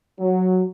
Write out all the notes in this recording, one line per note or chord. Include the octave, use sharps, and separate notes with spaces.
F#3